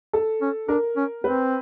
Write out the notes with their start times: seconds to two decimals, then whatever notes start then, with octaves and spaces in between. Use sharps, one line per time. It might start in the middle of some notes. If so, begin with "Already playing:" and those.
0.13 A4
0.41 C#4
0.68 D4 A#4
0.96 C#4
1.24 C4 B4